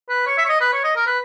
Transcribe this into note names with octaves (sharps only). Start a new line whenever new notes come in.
B4
C#5
E5
C#5
D#5
B4
C#5
D#5
A#4
B4